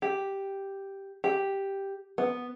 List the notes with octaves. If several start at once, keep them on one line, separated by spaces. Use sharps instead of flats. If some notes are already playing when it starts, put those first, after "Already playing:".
G4
G4
B3